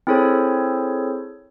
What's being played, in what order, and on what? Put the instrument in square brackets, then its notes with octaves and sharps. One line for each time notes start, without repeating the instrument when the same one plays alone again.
[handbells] C4 E4 G#4 A4 C5 C#5